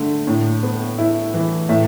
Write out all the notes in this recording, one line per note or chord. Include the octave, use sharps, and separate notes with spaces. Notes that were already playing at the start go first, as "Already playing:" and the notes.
Already playing: D3 A3
A2
B3
E4
E3
A2 E5